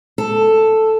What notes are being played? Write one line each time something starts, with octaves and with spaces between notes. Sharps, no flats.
A4